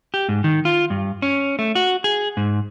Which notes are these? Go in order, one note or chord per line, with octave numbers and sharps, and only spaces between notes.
G4
G#2
D#3
F4
G2
C#4
A3
F#4
G#4
G#2